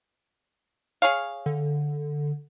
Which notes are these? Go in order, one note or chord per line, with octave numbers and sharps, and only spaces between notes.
G#4 C#5 F5
D3